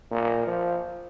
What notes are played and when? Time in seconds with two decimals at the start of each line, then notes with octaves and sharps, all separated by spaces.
0.11 A#2
0.47 F3